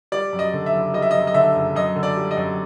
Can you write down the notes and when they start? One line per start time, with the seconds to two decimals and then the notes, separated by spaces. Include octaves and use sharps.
0.12 G3 D5
0.33 F#2
0.39 D#5
0.54 D3
0.66 E5
0.74 F#1
0.94 G3 D#5
1.02 E5
1.11 F#2 D#5
1.27 D#5
1.34 D3 E5
1.55 F#1
1.76 F#2 D#5
1.96 D3
2.03 D5
2.17 G3
2.31 D#5
2.37 F#2